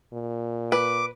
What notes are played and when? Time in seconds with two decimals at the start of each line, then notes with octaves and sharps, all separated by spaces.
0.13 A#2
0.72 B4 D6